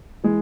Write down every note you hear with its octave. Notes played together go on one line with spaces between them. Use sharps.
E3 G#3